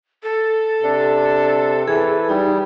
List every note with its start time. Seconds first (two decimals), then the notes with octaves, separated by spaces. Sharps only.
0.23 A4
0.83 C3 D4
1.88 E3 G#4
2.29 G3 D#4